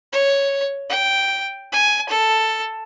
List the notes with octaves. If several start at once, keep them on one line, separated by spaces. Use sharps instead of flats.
C#5
G5
G#5
A4